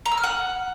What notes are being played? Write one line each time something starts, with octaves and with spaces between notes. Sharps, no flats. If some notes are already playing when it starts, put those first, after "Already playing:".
A#5
E6
F6
F#5